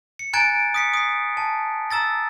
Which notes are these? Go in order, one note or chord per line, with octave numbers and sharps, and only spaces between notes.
C#7
G#5 A#5 F#6 G#6 A6 D7
D#6 B6 C#7
D#6 C7
A5
A#5 E6 A6 A#6